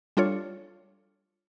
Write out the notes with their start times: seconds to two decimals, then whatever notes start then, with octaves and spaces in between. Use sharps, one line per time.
0.17 G3 D4 F4 A4 C#5